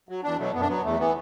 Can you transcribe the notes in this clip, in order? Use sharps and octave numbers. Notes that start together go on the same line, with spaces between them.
F#3
E2 D4
B2 F#3 A3
F#2 B3
D4
F#3 B3
E2 A3
E3 B3